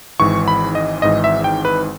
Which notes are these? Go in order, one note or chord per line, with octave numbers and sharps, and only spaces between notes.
G#1 G#2 E3 C#6
B5
D#5
G#1 G#2 E3 D#5
E5
G5
B4